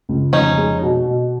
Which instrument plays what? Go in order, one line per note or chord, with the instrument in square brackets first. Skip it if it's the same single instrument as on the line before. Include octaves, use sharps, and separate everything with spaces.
[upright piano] C#2
[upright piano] F1 [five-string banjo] C#4 D#4
[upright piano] G#3
B2
B2